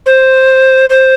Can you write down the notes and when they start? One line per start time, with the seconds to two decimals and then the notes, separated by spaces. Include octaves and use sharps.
0.06 C5
0.90 C5